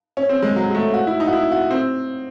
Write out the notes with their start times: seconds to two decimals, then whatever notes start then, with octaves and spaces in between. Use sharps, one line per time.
0.17 C#4
0.29 C4
0.42 G#3
0.56 F#3
0.70 G#3
0.75 A3
0.94 F#4
1.07 E4
1.20 D#4
1.28 F#4
1.33 E4
1.52 F#4
1.71 C4